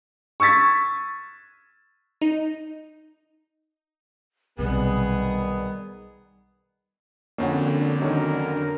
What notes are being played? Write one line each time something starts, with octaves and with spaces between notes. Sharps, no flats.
C#6 E6 G#6 A6 B6
D#4
B1 C3 D#3 G3 B3 G#4
F2 D3 A#3 C#4 F#4
D#3 F#3 C#4 A#4